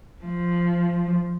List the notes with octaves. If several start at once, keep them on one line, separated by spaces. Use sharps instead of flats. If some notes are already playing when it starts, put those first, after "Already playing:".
F3